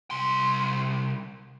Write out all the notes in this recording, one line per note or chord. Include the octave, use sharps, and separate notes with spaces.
C2 C6